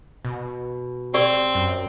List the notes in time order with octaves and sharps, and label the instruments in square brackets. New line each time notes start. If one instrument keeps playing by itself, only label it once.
[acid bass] B2
[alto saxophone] C4 [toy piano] G4 D5 E6
[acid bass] F#2